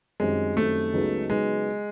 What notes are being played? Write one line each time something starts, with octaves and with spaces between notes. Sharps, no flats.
F#2 D#3 G3 G#3 C4
F#2 D#3 G3 A3 C4
C#2 C#3 F#3 B3 D#4
C#3 F#3 G#3 B3 D#4